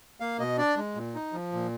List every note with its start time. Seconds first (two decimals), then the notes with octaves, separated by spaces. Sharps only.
0.20 A#3 F5
0.39 B2 D#5
0.58 D4 D5
0.77 G#3
0.95 A#2
1.15 D#4
1.33 F3
1.53 A#2